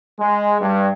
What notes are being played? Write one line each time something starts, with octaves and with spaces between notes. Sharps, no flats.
G#3
G2